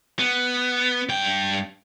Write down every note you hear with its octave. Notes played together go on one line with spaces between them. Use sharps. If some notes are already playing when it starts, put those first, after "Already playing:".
B3
G2 G5